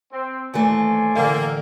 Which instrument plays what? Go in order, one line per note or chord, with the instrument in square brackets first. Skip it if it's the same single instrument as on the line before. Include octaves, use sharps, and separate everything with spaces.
[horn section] C4
[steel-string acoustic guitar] D#2 E3 A3 [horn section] C5 D5 G#5
[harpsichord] A1 D3 [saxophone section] A#3